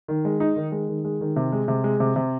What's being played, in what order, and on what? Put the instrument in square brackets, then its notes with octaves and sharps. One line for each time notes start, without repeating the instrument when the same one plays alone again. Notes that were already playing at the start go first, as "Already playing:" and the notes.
[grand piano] D#3
G#3
D#4
D#3
G#3
D#3
G#3
D#3
C3
G#3
C3
G#3
C3
C3